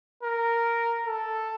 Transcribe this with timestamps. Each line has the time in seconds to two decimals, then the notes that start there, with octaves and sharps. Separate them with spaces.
0.23 A#4
1.06 A4